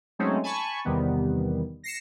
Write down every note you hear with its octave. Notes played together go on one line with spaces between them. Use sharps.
F#3 G#3 A3 C4 C#4 D#4
G#5 A5 B5 C#6
E2 C3 D#3 G3 B3
A#6 C7 C#7 E7